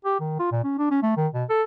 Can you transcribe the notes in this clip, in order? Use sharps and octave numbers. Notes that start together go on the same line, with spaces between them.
G4
D#3
F4
A#2
C#4
D4
C#4
A3
D#3
B2
A4